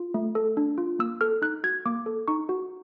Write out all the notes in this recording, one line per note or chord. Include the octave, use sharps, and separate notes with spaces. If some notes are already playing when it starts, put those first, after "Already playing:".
Already playing: F4
A3
A4
D4
F4
A#3 E6
A4 F6
D#4 F#6
F#4 G#6
A#3 D6
A4
D#4 C#6
F#4